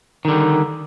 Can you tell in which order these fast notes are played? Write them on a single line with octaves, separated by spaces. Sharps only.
D#3 D3 G3